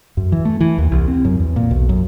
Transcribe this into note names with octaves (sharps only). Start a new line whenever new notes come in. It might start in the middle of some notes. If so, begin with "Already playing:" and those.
F#2
E3
A3
E3
D#2
C2
C4
F#2
E2
A#2
B1
F#2